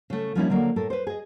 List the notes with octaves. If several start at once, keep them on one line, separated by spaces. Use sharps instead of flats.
C#3 A3
F3 G3 A#3 C#4 D#4 E4
D3 F#3 A#3 D4
A2 A4 A#4
B4 C5
G#4 D#5